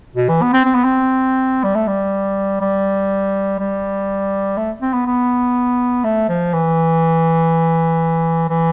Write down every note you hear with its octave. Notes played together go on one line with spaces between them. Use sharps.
B2
E3
B3
C4
C4
B3
C4
G3
A3
G3
G3
G3
A3
C4
B3
B3
A3
F3
E3
E3